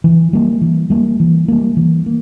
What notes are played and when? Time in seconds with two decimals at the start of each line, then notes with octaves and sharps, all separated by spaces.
0.04 E3
0.33 G3 A#3
0.61 E3
0.90 G3 A#3
1.20 E3
1.48 G3 A#3
1.77 E3
2.06 A#3